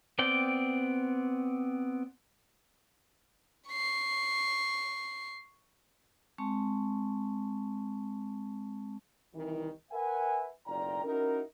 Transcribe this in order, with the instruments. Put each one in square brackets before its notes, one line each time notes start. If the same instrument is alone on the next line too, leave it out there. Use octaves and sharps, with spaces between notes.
[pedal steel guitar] B3 C4 D5 G5
[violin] C#6 C7
[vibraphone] G#3 C4 A5 C#6
[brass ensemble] C2 D#3 E3
A#4 B4 E5 F#5 G#5
F#1 B1 F4 D5 G5 A#5
C#4 D#4 E4 F#4 A#4